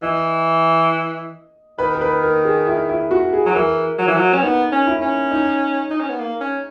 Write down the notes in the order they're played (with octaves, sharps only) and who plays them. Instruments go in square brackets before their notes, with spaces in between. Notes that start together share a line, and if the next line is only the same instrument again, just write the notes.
[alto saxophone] E3 [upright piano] D#5
[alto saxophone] D#3 [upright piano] B4
[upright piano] A#4
B4
A#4
G#4
E4
E4
F#4
G#4
[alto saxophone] F#3
[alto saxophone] E3 [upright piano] A#4
[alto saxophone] F#3
E3
F#3
C#4
[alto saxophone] B3 [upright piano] D#4
[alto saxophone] C#4
[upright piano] E4
[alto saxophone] C#4
[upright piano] D#4
[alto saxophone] D#4
C#4
B3
A#3
C#4